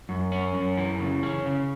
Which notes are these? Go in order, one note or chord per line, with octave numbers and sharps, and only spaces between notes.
F#2
C#4
F#2
E3
C#3
C#4
C#3